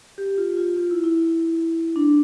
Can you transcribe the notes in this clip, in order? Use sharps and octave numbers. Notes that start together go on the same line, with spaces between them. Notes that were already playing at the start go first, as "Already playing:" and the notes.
G4
F4
F4
F4
E4
E4
D4